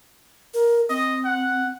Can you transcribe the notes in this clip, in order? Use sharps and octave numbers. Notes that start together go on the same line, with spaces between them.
A#4
C4 D#5
F#5